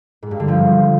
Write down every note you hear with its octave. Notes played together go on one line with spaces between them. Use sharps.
G#2
G2
D3
F3